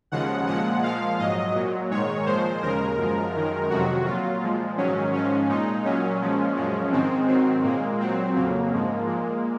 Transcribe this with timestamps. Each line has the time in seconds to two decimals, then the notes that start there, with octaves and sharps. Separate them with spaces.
0.12 D#2 C#3 F3 G#3 F#5
0.47 A#2 F3 G#3 F#5
0.83 A#2 F3 G#3 F5
1.19 G#2 F#3 D#5
1.55 A#2 F#3
1.91 G#2 D#3 G#3 C#5
2.26 A#2 F3 G#3 C5
2.62 D#2 C#3 G#3 A#4
2.98 F#2 F3 G#3
3.34 F#2 D#3 G#3
3.70 F2 C3 D#3 F#3 F#4
4.06 A#2 F#3 F4
4.41 A#2 F3 G#3
4.77 G#2 D#3 F#3 C#4
5.13 G#2 F3 G#3 C#4
5.49 A#2 G#3 D#4
5.85 A#2 F#3 C#4
6.21 A#2 F3 G#3
6.56 F#2 F3 G#3
6.92 G#2 D#3 G#3 C4
7.28 G#2 D#3 F#3 C4
7.63 A#2 G#3 A#3
8.00 A#2 F#3 C4
8.35 F2 C#3 F#3 A#3
8.71 G#2 F3 G#3
9.07 A#2 G#3